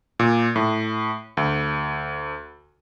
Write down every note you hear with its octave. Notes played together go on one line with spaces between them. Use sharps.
A#2
A2
D2